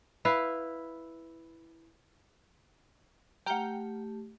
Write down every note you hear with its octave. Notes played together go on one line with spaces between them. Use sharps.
E4 B4 F5
A3 G4 F#5 G5 A#5 F6 G6